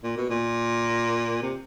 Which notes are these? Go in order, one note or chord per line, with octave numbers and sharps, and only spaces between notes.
A#2
B2
A#2
C3